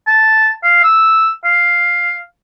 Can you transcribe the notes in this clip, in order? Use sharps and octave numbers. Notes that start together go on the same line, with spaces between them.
A5
F5
E6
F5